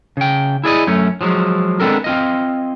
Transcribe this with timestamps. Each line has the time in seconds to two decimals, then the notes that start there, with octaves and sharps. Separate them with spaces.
0.17 C#3 G5
0.64 E4 G#4 D5 D#5
0.87 F#2 A3 C#4
1.21 F3 F#3 G#3
1.80 G#3 B3 C4 D4 A4 A#4
2.04 C4 F4 D#5